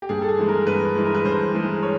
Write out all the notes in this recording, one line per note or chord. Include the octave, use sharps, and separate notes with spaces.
G4
G2 G#4
A4
G#4
E3 G#3
A#4
G2 B4
E3 G#3
A#4
B4
G2 C5
E3 G#3
C#5